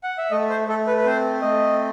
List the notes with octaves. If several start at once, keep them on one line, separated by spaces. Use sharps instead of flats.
F#5
E5
A3 D#5
C5
A3 A4
B4
B4
C4 C5
A3 D#5